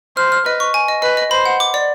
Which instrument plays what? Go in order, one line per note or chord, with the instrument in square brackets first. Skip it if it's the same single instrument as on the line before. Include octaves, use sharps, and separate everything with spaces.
[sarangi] C5 [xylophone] F6
[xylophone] F6
[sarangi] B4 [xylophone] D#5
[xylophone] C#6
G#5
D#5
[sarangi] B4 [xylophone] D#5
[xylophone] D#5
[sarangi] C5 [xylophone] B5
[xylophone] F#5
D6
D5